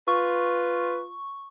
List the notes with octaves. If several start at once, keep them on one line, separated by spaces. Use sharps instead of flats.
F4 B4 C#6